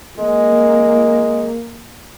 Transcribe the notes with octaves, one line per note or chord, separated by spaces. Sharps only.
G#3 A#3